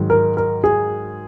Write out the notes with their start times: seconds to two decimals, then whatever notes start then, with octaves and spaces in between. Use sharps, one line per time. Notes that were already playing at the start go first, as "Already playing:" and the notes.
Already playing: G#2 D#3 F#3
0.10 A#4
0.37 A#4
0.64 G#4